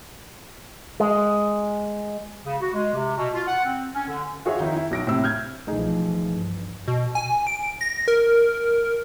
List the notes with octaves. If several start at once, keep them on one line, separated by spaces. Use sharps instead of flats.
G#3
C#3
F#4
G#3
C3
B2
F4
F#5
C4
C#4
D3
F4 F#4 G#4 C#5 E5
D#3 D#4 E4
E4
B1 A#6 D7
A2 C3 E6
F6 G6 G#6
B1 E3 F3 A3 D#4 G#4
G2
B2
G#5
D7
A#6
A#4